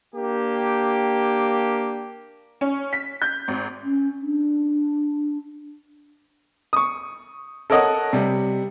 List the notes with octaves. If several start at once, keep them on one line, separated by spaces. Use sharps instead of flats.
A#3 D4 G4
C#4
B6
G6
G#1
C#4
D4
C#6 D#6
A4 A#4 C#5 D#5 F#5 D#6
C3 G3